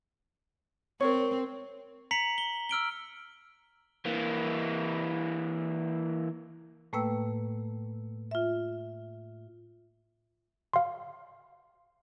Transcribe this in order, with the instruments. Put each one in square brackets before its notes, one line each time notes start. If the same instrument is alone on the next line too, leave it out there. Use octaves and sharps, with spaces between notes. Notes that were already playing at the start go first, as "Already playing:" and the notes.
[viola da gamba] C4 [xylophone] A#4 C#6 [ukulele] C#5
[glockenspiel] A#5 B6 C#7 F#7
G7
E6 F6 D7 G7
[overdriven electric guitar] E3 A#3
[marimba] A2 A3 A#3 B4 G5 E6
F4 E5
[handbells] F5 C6